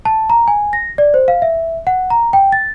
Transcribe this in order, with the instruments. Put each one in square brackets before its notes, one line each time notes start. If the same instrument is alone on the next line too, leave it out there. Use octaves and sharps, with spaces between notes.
[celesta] A5
A#5
G#5
A#6
D5
C5
F5
E5
F#5
A#5
G5
A6